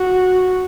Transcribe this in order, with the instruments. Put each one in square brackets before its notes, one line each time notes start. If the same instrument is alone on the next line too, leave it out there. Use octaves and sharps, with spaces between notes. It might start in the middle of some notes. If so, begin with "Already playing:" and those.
Already playing: [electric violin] F#4